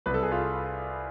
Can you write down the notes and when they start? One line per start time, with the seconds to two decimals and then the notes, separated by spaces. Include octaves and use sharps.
0.06 C2 B4
0.14 A4
0.23 G#4
0.31 F4 A4